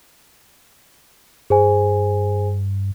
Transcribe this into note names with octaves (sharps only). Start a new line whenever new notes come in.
G2 G#4 C5 G#5